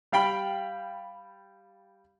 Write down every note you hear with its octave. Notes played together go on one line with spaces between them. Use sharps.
G3 F5 G5 B5